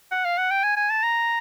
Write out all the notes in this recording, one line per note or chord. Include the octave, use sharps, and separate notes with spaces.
F#5
F5
F#5
G5
G#5
G#5
A5
A#5